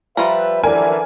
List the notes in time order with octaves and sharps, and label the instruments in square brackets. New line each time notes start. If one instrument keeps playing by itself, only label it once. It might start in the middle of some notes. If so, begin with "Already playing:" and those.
[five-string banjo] F3 G3 A#5 [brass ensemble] B4 E5
[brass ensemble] F#2 D3 E3 [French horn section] A4 D5 [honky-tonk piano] A#4 G#5